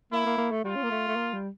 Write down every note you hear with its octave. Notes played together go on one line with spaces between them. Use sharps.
A#3 E4
A#3
A#3
A3
G3 F4
C#4
A#3
A3
A3
A#3
G3